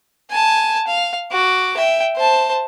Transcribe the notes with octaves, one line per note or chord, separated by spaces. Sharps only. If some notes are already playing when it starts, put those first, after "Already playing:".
G#5 A5
F5
F#4 D6
E5 G5
C5 A5